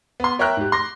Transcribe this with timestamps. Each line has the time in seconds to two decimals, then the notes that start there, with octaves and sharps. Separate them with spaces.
0.20 B3 C6
0.39 A#4 C#5 E5 G5 A#5 F#6
0.57 G#2 G4
0.72 C6 D6 A#6